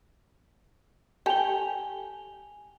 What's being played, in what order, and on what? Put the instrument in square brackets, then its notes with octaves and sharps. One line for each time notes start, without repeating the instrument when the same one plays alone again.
[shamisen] G4 A4 [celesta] G#5 F7 G7